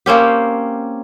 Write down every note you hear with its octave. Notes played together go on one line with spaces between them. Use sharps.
A#3 C4 C#4 G4